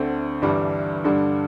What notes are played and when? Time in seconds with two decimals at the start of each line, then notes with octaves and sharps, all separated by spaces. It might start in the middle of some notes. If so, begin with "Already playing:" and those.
Already playing: D2 D3 A3 C4
0.42 G1 G2 E3 G3 D4
1.04 G2 D3 G3 D4